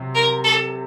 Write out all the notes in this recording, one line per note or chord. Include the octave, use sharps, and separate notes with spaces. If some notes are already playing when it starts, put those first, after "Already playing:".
Already playing: C3 F#3 C4
A#4
A4